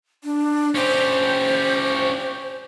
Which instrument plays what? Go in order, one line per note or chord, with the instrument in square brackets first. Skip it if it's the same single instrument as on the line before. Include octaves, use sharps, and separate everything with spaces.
[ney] D4
[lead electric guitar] C#4 G4 [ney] C5